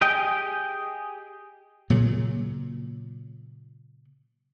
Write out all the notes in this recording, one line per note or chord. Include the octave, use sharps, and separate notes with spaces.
G4 G#4 D#5 G5
A#2 C#3 F#3